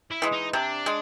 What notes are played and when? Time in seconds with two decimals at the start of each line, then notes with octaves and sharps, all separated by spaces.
0.11 E4
0.22 E3 G#3
0.33 D#4
0.53 C3 D4
0.86 G#3